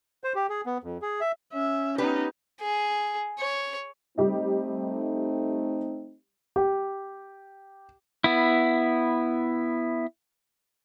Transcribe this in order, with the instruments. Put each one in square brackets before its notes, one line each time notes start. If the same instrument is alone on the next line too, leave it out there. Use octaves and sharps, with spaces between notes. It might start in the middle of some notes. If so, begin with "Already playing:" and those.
[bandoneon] C5
G4
G#4
B3
F2
G#4
E5
[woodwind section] C#4 [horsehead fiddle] E5
[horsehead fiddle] B3 D#4 [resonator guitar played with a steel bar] G4 B4
[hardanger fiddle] G#4
C#5
[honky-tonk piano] G3 G4 D#5 [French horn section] A3 C4 D#4
[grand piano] G4
[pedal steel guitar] B3 E4